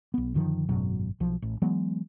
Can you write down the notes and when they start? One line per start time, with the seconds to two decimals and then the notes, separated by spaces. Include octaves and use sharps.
0.14 B1 B3
0.34 F#2 D3 D#3 F3
0.69 G#1 F#2 B2 F#3
1.20 B1 F3
1.42 A1
1.62 E3 F#3 G#3 B3